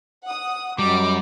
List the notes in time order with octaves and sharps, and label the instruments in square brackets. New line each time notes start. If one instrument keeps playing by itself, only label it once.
[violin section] F#5 D#6
[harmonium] F#2 [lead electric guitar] G3 [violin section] F#4 D#5 A#5 [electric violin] D6